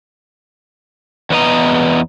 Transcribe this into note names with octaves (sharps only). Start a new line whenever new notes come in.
E2 B3 D#5 A#5